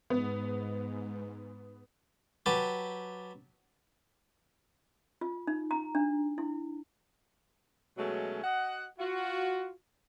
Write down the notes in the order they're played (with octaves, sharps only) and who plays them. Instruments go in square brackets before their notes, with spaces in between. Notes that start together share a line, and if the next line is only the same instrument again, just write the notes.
[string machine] G#2 [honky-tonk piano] B3
[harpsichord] F#3 G4 B4 A5
[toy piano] F4
D#4
A#5
D4
E4
[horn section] B2 F#3 G#3 A3 C#4
F#4 D#5 F#5
F4 F#4